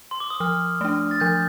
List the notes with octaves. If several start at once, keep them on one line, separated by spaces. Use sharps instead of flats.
C6
D6
D#6
F3 F6
A3 D4
A6
F3 G6